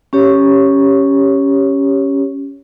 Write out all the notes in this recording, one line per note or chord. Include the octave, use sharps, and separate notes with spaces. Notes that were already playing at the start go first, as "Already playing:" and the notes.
C#4 G4 C#5